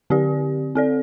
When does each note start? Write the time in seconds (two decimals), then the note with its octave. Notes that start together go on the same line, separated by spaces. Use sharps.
0.10 D3 C4 G4 D5
0.75 C4 A4 D5